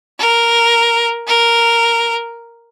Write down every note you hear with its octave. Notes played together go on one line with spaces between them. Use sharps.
A#4
A#4